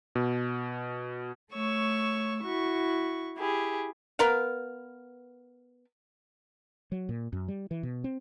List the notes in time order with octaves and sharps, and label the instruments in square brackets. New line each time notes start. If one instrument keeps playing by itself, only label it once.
[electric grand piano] B2
[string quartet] A3 C#5 C#6 E6
E4 F#4 C#6
E4 G4 G#4
[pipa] B3 A#4 F5
[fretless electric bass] F#3
A#2
F#2
G3
E3
B2
C4